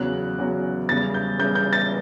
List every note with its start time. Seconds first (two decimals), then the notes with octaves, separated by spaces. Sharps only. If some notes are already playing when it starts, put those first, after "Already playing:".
Already playing: E2 C#3 F#3 F#6
0.38 E2 C#3 F#3
0.89 E2 C#3 G3 A6
1.14 G6
1.38 E2 C#3 G3 G6
1.55 G6
1.73 A6